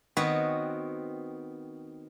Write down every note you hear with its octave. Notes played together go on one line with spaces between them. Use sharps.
D#3 B3 C4 F#4 B4 C#5